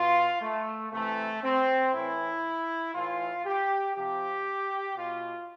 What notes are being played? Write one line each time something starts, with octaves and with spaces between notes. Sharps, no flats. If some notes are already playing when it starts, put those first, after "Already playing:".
Already playing: B2 F4
A3
C3 E3 A3
C4
A2 E3 E4
A2 E3 F4
G4
C3 F3 G4
B2 F4